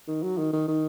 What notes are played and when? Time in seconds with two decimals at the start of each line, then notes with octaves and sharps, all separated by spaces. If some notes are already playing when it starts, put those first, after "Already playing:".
0.08 D#3
0.23 F#3
0.38 D#3
0.53 D#3
0.68 D#3